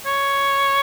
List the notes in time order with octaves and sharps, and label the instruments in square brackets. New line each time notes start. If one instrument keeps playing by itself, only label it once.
[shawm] C#5